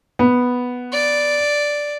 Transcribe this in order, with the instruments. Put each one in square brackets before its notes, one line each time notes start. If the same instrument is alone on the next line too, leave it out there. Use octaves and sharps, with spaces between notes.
[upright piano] B3
[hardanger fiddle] D5